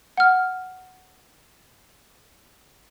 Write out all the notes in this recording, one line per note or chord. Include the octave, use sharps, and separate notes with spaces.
F#5 F6